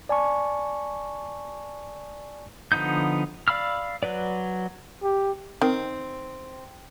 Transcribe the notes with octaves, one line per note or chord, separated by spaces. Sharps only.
D5 G#5 A5 C#6
D3 F3 B3 D#4 G6
D5 F5 B5 E6 F6
F#3 B4 D5
G4
D#3 C4